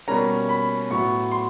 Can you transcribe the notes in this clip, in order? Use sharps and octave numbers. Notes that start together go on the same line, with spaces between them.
B2 G3 A#3 C#4 A#5
B5
A2 F#3 B3 C#6
C6